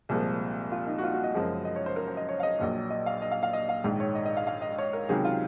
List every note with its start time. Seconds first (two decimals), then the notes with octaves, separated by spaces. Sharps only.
0.09 C2 A#2 F3 G#3
0.72 F4
0.87 D#4
0.98 F#4
1.04 F4
1.14 F#4
1.24 D#5
1.35 F#1 F#2 F3 G#3
1.65 D#5
1.76 C#5
1.86 C5
1.96 A#4
2.08 C5
2.17 D#5
2.29 C#5
2.40 F5
2.43 D#5
2.59 A#1 A#2 F#3
2.90 D#5
3.06 F5
3.22 D#5
3.31 F5
3.43 F5
3.53 D#5
3.69 F5
3.84 A#1 G#2 D#3 G#3
4.00 C#5
4.15 D#5
4.26 D#5
4.37 F5
4.47 F5
4.62 D#5
4.78 C#5
4.93 A#4
5.09 C#2 C3 D#3 F#3 G#4
5.25 F4